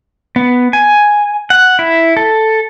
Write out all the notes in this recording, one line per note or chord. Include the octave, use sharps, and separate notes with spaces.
B3
G#5
F#5
E4
A4